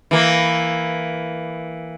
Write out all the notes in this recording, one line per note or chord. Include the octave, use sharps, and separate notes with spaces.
E3 A#3